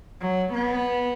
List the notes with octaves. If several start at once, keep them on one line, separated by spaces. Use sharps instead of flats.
F#3
B3